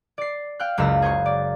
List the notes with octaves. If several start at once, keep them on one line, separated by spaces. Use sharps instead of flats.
D5 C7
F5 G5 F6 F#6
F#1 C#2 A#4 F5 A#5 E6
G#4 C5 C#5 C#6
D5